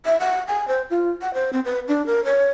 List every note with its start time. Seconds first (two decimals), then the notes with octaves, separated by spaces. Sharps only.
0.05 E5
0.20 F#5
0.48 G#5
0.68 C5
0.90 F4
1.21 F#5
1.34 C5
1.53 C4
1.65 B4
1.88 D4
2.06 A#4
2.25 C#5